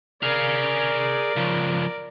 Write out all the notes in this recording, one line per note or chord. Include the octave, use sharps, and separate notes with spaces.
G#4 A#4 D5 F5
C#3 F3